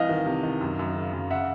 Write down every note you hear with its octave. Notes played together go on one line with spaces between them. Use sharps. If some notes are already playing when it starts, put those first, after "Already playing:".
Already playing: C2 E3 D#5 F5
D#3
C3
D#3
F#2
F#2
C#3
F#2
C#3 E5 F#5